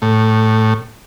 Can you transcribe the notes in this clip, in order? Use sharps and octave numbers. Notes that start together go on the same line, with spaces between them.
A2